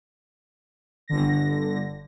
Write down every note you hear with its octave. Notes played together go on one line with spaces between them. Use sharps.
G1 D3 A#6